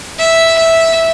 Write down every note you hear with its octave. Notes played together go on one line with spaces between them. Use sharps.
E5
E5